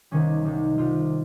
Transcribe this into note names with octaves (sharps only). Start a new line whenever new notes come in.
C2 C3 D#3 G3 C#4
C2 C3 G3 D#4
C2 C3 G3 F4